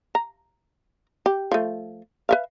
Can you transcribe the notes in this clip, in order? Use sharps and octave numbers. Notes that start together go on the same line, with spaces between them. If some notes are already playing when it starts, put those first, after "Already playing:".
A#5
G4
F3 A3
B4 E5 F5